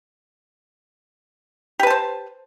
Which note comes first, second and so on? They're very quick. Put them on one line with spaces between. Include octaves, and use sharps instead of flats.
G4 B4 A5 C5